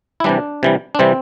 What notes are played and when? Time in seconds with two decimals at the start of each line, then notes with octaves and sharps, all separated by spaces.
0.20 E4
0.24 C3 E3 G3 D4
0.63 C3 E3 G3
0.95 D4
0.99 C3 E3 G3 C4